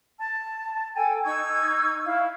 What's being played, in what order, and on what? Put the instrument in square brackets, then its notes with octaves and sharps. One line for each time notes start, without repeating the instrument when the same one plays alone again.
[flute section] A5
A4 G5 G#5
D#4 C#6 E6 G#6
E4 F5